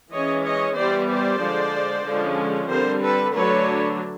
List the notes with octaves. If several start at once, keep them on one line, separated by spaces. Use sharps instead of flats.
E3 G#3 C#4 C#5 D#5
C#5 D#5
E3 G3 B3 C5 D5
C5 D5
D3 F3 G#3
D3 F3 G#3 C#4
D3 G3 C4 A#4 C5
A4 B4
D3 F#3 A3 D4 B4 C#5